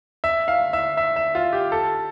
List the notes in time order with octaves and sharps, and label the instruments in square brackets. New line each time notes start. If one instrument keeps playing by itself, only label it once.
[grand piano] E5
F5
E5
E5
E5
F4
G4
A4